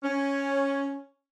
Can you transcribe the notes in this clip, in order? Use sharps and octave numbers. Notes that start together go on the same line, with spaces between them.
C#4